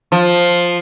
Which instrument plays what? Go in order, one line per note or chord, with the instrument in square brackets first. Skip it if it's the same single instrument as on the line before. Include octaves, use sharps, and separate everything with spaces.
[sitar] F3